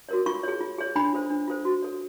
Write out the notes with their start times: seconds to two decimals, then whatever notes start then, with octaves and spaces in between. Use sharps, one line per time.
0.09 F#4 A#4 C#5
0.26 F4 C#6
0.43 G#4 C#5
0.61 F4
0.78 G#4 C#5
0.96 D4 B5
1.13 F4 A4 C5
1.30 D4
1.48 F4 A4 C5
1.65 F#4
1.83 A4 C#5